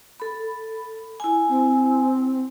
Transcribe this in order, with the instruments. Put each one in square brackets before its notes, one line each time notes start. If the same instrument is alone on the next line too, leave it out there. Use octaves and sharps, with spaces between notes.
[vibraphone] A4 B5
E4 G#5
[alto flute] C4